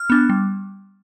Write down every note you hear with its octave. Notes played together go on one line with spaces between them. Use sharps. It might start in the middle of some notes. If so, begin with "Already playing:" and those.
Already playing: F6
B3 D4
G3